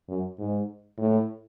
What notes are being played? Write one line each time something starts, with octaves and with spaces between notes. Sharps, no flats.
F#2
G#2
A2